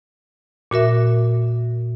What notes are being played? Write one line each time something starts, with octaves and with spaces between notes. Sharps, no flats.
A#2 F#4 A#4 E5